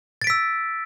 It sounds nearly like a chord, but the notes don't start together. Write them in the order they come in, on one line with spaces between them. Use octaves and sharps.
A6 D7 B6 E6